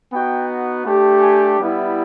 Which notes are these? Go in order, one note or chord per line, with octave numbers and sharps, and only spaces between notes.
B3 D#4 F#4 G5
A3 D4 G4
G#5
G3 B3 E4